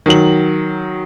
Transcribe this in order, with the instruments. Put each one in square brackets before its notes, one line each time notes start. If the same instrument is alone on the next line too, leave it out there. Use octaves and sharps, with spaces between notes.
[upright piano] D#3 F#3 F#7